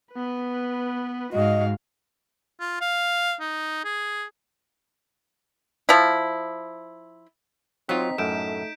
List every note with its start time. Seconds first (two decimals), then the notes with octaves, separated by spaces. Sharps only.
0.13 B3 B4
1.33 G#2 F#4 D#5 F5
2.60 F4
2.81 F5
3.40 D#4
3.85 G#4
5.89 F3 E4
7.89 F#3 C4 D#4 F4 B6
8.18 F#2 A2 A3 G6 D7 E7